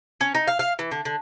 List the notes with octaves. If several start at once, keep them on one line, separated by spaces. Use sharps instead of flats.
C#4
D#4
F5
F5
E3
D3
D3